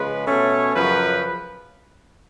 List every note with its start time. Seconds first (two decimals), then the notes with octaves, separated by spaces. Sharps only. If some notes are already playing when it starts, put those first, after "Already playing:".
Already playing: C#3 F3 G#3 B4
0.26 B2 A3 C#4 C#5
0.74 F#2 C#3 F3 B4